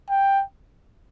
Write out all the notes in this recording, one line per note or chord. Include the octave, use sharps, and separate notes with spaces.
G5